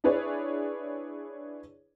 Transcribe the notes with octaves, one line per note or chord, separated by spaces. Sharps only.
D4 E4 G#4 B4 C#5 D5